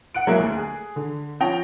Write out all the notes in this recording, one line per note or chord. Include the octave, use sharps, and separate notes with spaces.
F#5 F#6 D7
F#3 G#3 A#3 E4 G#4
D2
G#4
D3
F3 C#4 G5 A#6 F7